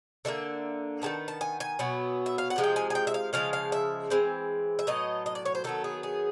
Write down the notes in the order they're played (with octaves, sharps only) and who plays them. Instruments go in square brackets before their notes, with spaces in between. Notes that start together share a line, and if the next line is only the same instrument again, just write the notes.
[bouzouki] D3 F3 A#3 E5
D#3 G#3 B3 A5
A5
G#5
G#5
B2 F#3 B3
E5
F5
F#5
C3 F3 G#3
G5
G#5
G#5
G5
E5
F5
C#3 F3 G#3 F5
F5
E5
E3 G#3 C4
E5
A2 F#3 B3 D#5
D#5
D5
C#5
C5
D#3 F#3 B3 A4
G#4
G#4